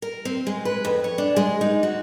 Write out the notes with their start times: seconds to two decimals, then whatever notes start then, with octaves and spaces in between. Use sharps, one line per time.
0.02 A#4
0.25 C4
0.47 G#3
0.65 B4
0.85 F2
1.04 C#5
1.18 D4
1.36 G#3
1.61 D#4
1.83 F#4